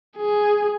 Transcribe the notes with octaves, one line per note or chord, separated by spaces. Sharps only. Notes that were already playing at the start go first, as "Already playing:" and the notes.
G#4